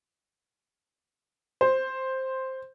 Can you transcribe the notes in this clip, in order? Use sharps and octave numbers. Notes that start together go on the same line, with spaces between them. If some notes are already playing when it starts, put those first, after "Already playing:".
C5